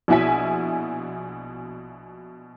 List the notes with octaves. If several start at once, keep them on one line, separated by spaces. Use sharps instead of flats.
A#1 B2 E4 E5 G#5 B6